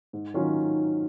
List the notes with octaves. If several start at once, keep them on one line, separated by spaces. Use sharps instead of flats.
G#2
D#3 F#3 C#4 F4